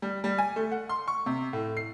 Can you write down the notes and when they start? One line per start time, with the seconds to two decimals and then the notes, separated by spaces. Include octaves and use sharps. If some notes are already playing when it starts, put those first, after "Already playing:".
0.02 G3
0.24 G3
0.38 G#5
0.56 A3
0.72 F#5
0.89 C6
1.08 C#6
1.26 C3
1.53 A2
1.77 C7